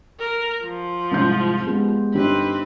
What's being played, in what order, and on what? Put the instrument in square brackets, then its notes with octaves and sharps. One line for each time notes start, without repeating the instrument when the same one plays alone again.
[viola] A#4
F3
[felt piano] C2 G#2 G6
G#3 B3 G4
[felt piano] G1 D#4 G4 [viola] C4 B4